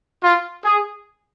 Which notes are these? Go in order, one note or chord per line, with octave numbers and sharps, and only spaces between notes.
F4
G#4